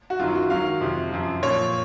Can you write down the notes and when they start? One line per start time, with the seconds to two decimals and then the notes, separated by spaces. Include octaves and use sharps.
0.10 F#4
0.19 F#2 D#3 F#3 F4
0.35 F#4
0.50 G#2 D#3 F#3 F5
0.81 F2 C3 F3
1.12 F#2 F3
1.42 A#2 F3 C#5